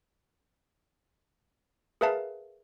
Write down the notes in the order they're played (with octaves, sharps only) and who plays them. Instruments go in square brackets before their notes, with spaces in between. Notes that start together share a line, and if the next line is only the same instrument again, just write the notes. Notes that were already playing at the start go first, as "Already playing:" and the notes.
[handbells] G#4 A#4 B4 E5 F5 A5